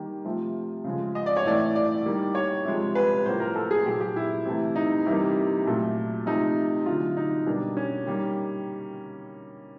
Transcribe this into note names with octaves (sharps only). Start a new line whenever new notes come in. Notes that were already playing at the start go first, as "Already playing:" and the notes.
Already playing: D#3 G3 A#3
C3 F3 A3
C#3 F3 G#3
D#5
D5
C#5
A2 E3 A3 D5
D5
D#3 G3 A#3
C#5
C3 F3 G#3
B4
A2 F3 A#3 C5
A#4
A4
G#4
A#2 F#3 A#3 G4
G4
E4
C3 E3 A3
D#4
C3 E3 G3 A#3
A#2 F#3 A3
C3 F3 A3 D#4
D3 F#3 A3 F4
D#4
B2 G3 A#3 D4
C#4
D#3 G3 A#3